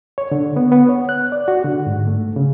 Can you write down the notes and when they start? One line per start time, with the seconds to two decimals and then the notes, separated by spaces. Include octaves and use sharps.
0.18 C#5
0.32 D3
0.56 B3
0.72 B3
0.89 C#5
1.09 F#6
1.32 D5
1.48 F#4
1.64 D3
1.87 G#2
2.07 A3
2.36 C#3